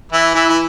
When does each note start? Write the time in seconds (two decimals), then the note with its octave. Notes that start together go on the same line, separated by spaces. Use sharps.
0.12 E3 E4
0.35 E3 E4
0.49 E4